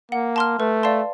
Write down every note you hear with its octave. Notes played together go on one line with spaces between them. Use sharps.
A#3 F#5
A5 C6 F6
A3 B4
D5 F5 A5 C6